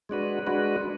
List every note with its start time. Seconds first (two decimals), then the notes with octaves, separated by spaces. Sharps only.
0.09 G#3 D4 F#4 B4
0.47 G#3 D4 F#4 B4